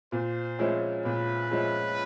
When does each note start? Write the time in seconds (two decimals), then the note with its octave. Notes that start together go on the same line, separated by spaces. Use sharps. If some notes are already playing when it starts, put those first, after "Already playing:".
0.12 A#2 C5
0.59 F3 G#3 C#4 E4
1.05 A#2 B4
1.51 F3 G#3 C#4 E4